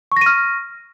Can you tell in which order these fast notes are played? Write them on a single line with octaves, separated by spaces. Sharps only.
C#6 A#6 D#7 F6